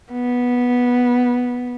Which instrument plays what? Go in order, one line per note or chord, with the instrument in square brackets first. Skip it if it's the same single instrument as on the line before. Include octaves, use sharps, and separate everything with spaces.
[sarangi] B3